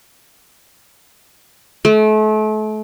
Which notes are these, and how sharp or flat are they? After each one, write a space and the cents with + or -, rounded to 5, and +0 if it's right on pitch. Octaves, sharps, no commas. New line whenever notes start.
A3 -35